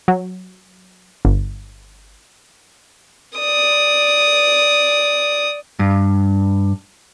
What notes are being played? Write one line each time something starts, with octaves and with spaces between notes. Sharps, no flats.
F#3
G1
D5 D#6
G2